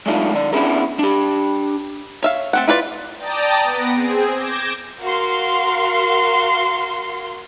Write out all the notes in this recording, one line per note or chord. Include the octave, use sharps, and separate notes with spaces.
F#3 G#3 A3 D4 D#4 F4
D#3 D5
B3 C#4 D4 E4 G#4 A#4
D4 G4
C#5 E5 F5
A3 C4 F#5
E4 F4 B4 D5
D5 G5 A5 A#5 D#6 A6
B3 A#6 D7
C4 G#4
D6 G6 G#6 A#6 E7
F#4 A#4 F5 C6